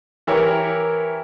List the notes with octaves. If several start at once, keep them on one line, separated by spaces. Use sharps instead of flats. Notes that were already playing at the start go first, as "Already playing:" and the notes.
E3 E4 G4 A#4 C#5